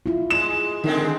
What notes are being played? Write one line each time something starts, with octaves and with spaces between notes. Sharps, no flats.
E4 F4
G#3 E7
D3 D#3 G#3 C4